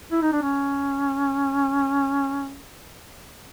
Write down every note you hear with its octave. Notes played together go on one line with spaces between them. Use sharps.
E4
D#4
D4
C#4